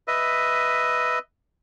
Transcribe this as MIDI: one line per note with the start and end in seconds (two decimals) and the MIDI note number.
0.08 1.19 71
0.08 1.19 75
0.08 1.19 76